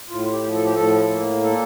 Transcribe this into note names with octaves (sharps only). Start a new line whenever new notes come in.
A2 F4
G4
F3
A4
G4
A2 A4
A#3
A#2 A4